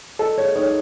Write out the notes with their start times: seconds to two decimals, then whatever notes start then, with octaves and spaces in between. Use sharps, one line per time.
0.19 A4 D#5
0.38 G#4 C#5
0.55 D#4 C#5